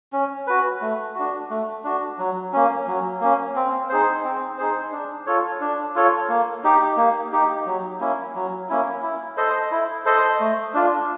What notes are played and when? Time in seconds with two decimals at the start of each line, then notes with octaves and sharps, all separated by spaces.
0.13 C#4
0.47 F#4 B4
0.81 A3
1.16 D4 F#4
1.50 A3
1.84 D4 F#4
2.18 F#3
2.53 A#3 C#4
2.87 F#3
3.21 A#3 C#4
3.56 C4
3.89 D#4 G#4 C5
4.24 C4
4.58 D#4 G#4 C5
4.92 D4
5.26 F4 A4 C#5
5.61 D4
5.95 F4 A4 C#5
6.29 A#3
6.64 D#4 G4
6.97 A#3
7.32 D#4 G4
7.66 F#3
8.00 A#3 C#4 E4
8.35 F#3
8.69 A#3 C#4 E4
9.03 E4
9.37 A4 C5 D#5
9.71 E4
10.06 A4 C5 D#5
10.40 A3
10.74 D4 F4